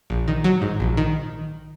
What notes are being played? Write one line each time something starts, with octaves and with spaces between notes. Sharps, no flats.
A#1
D#3
F#3
G#2
A#1
D#3